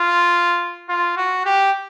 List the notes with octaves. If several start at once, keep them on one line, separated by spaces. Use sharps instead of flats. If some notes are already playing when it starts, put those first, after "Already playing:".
Already playing: F4
F4
F#4
G4